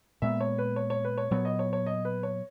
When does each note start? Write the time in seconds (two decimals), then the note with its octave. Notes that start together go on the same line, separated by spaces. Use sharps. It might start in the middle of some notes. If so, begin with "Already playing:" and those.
0.22 A#2 G#3 B3 E5
0.40 C#5
0.58 B4
0.76 C#5
0.90 C#5
1.05 B4
1.18 C#5
1.31 A#2 F#3 B3 C#5
1.45 D#5
1.59 C#5
1.73 C#5
1.86 D#5
2.05 B4
2.23 C#5